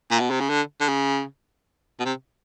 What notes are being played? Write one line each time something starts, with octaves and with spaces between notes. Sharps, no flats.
A#2
B2
C3
C#3
D3
D3
C#3
B2
C3